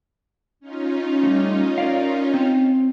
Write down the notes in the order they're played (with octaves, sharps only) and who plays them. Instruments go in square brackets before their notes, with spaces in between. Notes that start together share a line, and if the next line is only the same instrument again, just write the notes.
[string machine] C#4 D#4 F4
[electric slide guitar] G3 A3
A#4 D5 F5
C4